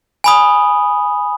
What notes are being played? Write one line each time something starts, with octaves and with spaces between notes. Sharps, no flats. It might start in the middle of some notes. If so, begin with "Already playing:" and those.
G#5 B5 D#6